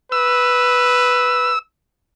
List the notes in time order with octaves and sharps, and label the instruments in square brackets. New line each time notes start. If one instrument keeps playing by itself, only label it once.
[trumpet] B4 [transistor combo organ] E6